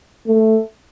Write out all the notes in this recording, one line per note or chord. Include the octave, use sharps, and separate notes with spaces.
A3